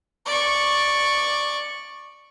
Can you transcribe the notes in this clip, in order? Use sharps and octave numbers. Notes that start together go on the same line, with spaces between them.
D5 C#6